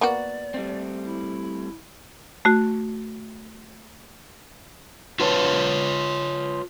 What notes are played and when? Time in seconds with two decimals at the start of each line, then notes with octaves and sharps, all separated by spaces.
0.01 A#3 B3 F#4 D5
0.54 G3 A3 C4
1.03 E4
2.45 A3 F#4
5.20 F4 B4 C#5 A5